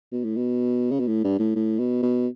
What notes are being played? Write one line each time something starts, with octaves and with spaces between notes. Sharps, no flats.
B2
A2
B2
C#3
B2
A2
G2
A2
A2
B2
B2